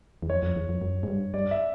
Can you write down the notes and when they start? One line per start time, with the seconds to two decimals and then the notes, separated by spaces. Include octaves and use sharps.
0.22 E2
0.30 F2 C#5
0.43 F2
0.56 E2
0.69 F2
0.82 F#2
1.03 G#2
1.08 G2
1.34 G2 D5
1.51 E5